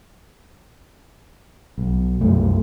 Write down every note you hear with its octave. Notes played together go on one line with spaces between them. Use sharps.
B1
C2 F#2 A3